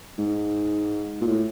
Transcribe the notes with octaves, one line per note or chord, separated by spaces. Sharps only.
G#2
A#2
A2